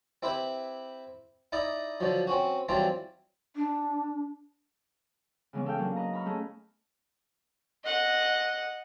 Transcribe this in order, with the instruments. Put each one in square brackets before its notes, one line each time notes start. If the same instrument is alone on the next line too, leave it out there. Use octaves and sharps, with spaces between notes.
[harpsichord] C4 E4 G4 B4
D#4 E4 D5 D#5
D3 F3 F#3
C4 C#4 F#4
E3 F#3 G3 C4 D4 F4
[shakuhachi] D4
[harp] C#3 E3 G#3 B3 C#4
A4 F5 G5
F#3 A#3 C#4 D4
B4 D#5 A#5
A#5 B5 C#6 F6
A3 C#4 G#4
[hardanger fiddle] D#5 F#5